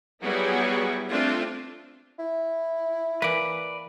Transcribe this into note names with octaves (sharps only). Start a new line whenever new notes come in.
F#3 G3 B3 E4 F#4 G#4
A3 C4 D4 F4
E4
E3 A#3 B4 D5